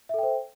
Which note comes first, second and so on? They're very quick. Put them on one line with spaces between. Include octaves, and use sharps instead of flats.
E5 A4 G5 C5